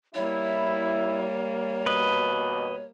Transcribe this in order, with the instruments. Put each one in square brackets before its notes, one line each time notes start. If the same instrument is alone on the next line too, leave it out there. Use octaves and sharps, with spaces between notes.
[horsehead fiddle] G3 A#3 [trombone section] E4 [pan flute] C#5
[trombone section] D#2 B2 [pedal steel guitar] B4 D#5